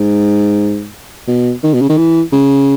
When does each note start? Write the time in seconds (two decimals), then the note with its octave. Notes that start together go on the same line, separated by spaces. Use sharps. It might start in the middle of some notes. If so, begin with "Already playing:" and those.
Already playing: G#2
1.28 B2
1.64 D#3
1.74 B2
1.82 C#3
1.90 D#3
1.98 E3
2.33 C#3